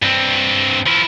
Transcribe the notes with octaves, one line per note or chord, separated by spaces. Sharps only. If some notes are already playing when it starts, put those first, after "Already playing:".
G2 C4
F3 E4